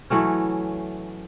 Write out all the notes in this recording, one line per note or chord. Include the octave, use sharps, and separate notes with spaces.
E3 F#3 A3 C#4